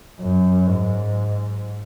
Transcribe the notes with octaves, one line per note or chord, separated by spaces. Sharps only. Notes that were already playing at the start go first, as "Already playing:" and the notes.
F#2
G#2